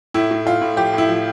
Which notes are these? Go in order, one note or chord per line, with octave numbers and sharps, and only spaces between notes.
A2 E4
A2
A2 F4
A2
F3 G4
A2 E4
F3